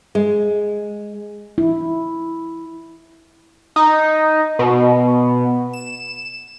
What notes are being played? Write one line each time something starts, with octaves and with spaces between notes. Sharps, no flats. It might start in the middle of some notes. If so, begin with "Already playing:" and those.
G#3
E4
D#4
B2
E7